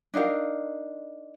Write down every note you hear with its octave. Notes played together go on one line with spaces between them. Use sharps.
D4 D#4 A#4 F5